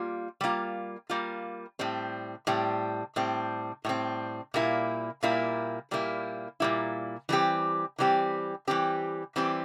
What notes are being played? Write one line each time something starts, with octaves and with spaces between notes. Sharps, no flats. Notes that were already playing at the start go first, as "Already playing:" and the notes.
Already playing: G3 A#3 F4
G3 A#3 F4
G3 A#3 F4
A2 G3 C4
A2 G3 C4
A2 G3 C4
A2 G3 C4
A#2 G3 A#3 E4
A#2 G3 A#3 E4
A#2 G3 A#3 E4
A#2 G3 A#3 E4
E3 G3 C4 G4
E3 G3 C4 G4
E3 G3 C4 G4
E3 G3 C4 G4